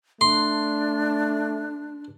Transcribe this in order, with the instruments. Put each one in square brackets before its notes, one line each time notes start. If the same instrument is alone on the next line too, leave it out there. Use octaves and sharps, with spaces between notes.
[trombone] A3 [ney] D4 [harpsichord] C6